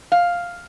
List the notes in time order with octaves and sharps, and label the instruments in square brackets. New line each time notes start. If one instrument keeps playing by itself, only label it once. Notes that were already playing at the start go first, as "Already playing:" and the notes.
[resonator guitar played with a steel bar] F5